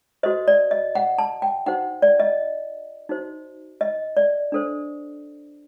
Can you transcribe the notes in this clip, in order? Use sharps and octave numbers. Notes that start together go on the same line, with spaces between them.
F#4 A4 C5 D#5
D5
D#5
F#5
A5
G5
D#4 F#4 C5 F#5
D5
D#5
D#4 F#4 C5
D#5
D5
D4 A4 C5